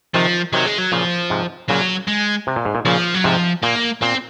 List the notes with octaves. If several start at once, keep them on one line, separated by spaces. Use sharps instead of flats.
C3 D#3 F3
C3 D#3 F#3
G#3
F#3
A#2 C#3 F3
G#2 C3
A#2 C#3 F#3
G#3
C3
A#2
G#2
A#2
A#2 C#3 F3
F#3
G#2 C3 F3
A#2 A#3
A#2 C4